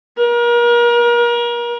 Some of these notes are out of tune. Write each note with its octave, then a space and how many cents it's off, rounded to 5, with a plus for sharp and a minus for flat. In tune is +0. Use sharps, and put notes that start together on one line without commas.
A#4 +35